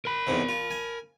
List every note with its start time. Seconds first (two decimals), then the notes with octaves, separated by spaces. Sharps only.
0.05 A#4 B5
0.27 E2 G#2 C3
0.49 F4
0.71 G#5